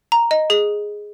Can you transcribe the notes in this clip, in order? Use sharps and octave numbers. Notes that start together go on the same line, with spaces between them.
A#5
D#5
G#4